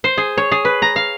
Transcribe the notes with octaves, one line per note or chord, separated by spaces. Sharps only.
C5
G#4
C#5
G#4
B4
A#5
F5